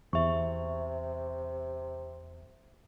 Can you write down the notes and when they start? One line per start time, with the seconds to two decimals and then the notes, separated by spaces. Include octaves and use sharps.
0.13 E2 C3 E5 C#6